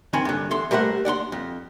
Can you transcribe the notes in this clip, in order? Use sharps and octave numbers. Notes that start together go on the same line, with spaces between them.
D#3 C4 G#5 B5
G2 D3
E2 A4 C6
G3 A3 A#4 C5 F#5
D5 F#5 A#5 C6
F2